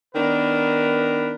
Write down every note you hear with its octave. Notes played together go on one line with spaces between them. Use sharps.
D#3 B3 D4 A#4 B4